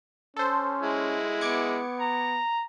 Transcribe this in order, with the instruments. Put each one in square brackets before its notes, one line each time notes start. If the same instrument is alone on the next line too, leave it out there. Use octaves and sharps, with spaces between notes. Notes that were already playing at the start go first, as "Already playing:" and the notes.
[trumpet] C#4 [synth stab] A4 C5
[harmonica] G#3 E4
[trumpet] B3 [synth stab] D6 G#6 C#7
[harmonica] A#5